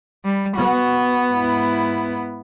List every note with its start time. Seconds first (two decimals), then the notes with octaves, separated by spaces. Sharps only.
0.25 G3
0.57 B3 F#4
1.32 G#2 E4